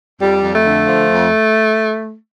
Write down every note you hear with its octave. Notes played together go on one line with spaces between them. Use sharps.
F2 G3
F2
A3
D3
F3
F2